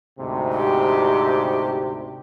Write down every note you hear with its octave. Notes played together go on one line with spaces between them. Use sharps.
D2 G#2 C3
G4